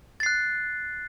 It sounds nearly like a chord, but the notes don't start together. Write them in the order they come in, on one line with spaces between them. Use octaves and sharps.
A6 C7 F#6